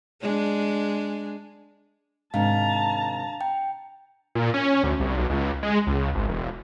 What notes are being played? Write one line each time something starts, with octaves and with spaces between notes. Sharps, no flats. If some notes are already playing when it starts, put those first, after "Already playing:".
G#3 D4
G#2 C3 D#3 D4 F5 A5 A#5
G5
A#2
C#4
D2
C2
B1
C#2
G#3
C#2
G#1
E1